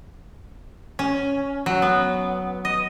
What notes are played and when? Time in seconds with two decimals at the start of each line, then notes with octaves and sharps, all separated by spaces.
0.99 C#4
1.66 F#3
1.82 B3
2.65 D#5